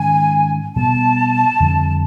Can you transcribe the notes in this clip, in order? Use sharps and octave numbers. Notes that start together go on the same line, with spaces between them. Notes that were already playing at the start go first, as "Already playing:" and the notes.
Already playing: G#2 D#3 G#3 C#4 G#5
B2 G3 B3 A5
F2 D3 G3 C4